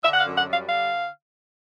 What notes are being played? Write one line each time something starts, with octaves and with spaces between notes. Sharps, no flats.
D3 E5
F#5
F5
F#2
F#5
G3 F5
D3 F5